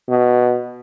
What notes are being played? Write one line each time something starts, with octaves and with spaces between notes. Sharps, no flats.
B2